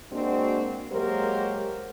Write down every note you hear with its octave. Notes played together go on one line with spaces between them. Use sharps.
G#3 A#3 C4 D4 F#4
F#3 G#3 A#3 G4 A#4 C5